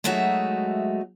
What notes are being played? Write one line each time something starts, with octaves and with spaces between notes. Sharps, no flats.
F#3 G#3 A3 D#4 F#4 E5